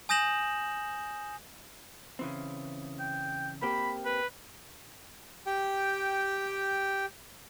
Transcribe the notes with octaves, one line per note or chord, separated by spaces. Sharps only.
G#5 D#6 G6 A#6 E7 F#7
C#3 E3 C4
G5
A#3 C4 G4 B5
B4
G4 G5